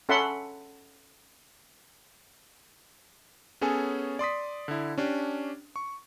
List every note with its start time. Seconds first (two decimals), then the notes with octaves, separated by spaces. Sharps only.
0.09 C#4 A4 E5 F#5 B5 C6
3.61 B3 C#4 G#4 A4 C#5 G#5
4.19 D5 C6 D#6 B6
4.68 D3 E4
4.98 C#4 D4 G4
5.76 C#6